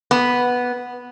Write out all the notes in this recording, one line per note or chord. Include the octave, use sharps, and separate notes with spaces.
B3